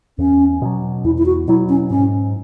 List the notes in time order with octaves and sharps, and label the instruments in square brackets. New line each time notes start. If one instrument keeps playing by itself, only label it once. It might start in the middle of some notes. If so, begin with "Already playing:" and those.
[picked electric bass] E2 [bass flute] C#4
[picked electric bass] B2 F#3
[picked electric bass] E2 [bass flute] E4
[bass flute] E4
F#4
[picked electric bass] B2 F#3 [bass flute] E4
[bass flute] C#4
[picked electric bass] G#2 [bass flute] C#4